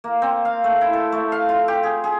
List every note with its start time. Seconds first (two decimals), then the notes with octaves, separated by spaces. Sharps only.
0.04 A#3
0.22 C4
0.45 F5
0.64 A3
0.81 E4
0.93 A4
1.12 A3
1.32 F5
1.49 F4
1.68 G4
1.83 G#4
2.04 G#4